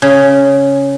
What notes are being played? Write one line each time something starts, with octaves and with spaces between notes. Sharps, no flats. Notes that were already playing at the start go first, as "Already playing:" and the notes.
C#3